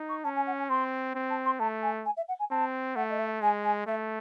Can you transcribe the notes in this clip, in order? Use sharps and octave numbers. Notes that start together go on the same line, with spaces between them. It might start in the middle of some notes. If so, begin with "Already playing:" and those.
Already playing: D#4
C#6
C#4 A5
G#5
F#5
G#5
C4 C6
C4
A5
C6
A3 A5
G#5
G#5
E5
F#5
G#5
C4 A5
A3 F#5
D#5
E5
G#3 G#5
G#5
A3 E5